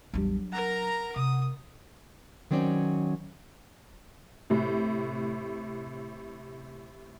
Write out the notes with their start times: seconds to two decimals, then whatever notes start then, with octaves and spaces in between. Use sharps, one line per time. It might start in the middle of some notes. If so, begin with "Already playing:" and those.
0.14 A1 E2 F#3 G3 D4
0.52 A#4 F#5 A#5
1.16 C3 D#6
2.51 D#3 F#3 C4 C#4 D5
4.50 A2 C3